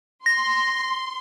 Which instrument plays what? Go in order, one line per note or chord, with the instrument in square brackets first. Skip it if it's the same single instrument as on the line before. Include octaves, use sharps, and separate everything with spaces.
[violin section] C6 [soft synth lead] A#6